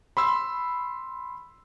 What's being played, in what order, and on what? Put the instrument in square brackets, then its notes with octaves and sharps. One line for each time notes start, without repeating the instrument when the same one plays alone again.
[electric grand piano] B5 C6 E6